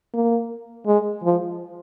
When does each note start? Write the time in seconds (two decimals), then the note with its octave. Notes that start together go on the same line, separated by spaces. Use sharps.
0.14 A#3
0.87 G#3
1.23 F3